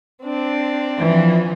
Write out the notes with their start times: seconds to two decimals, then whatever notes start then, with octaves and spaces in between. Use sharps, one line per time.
0.23 C4 D4
0.97 E3 F3